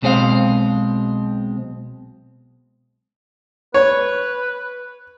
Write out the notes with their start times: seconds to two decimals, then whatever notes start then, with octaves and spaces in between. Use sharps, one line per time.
0.02 B1 B2 G#3 C4 C5 F5
3.74 B4 C#5